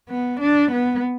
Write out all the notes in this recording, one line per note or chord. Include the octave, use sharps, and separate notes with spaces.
B3
D4
B3